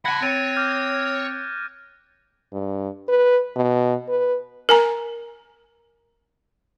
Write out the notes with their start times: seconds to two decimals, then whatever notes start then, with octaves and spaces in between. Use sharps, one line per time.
0.05 F#5 A5 B5 F#6 G#6 A#6
0.22 C4 C#5 A6 D7 D#7
0.56 D6 F6 G6
2.53 G2
3.09 B4
3.56 B2
4.09 B4
4.69 A#4 G#5 A#5